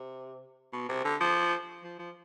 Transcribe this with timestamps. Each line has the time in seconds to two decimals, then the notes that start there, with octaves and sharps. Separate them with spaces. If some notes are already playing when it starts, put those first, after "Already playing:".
Already playing: C3
0.73 B2
0.89 C3
1.04 D3
1.21 F3
1.84 F3
1.99 F3